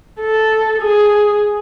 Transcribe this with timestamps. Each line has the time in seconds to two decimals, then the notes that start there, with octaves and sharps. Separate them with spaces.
0.20 A4
0.82 G#4